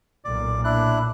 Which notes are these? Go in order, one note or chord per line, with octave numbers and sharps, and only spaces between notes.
B1 A#2 D5
D4 E4 F#6